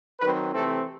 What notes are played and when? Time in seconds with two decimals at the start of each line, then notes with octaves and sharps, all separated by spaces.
0.20 D#3 F#3 C4 B4
0.53 C3 E3 A3 C4 A4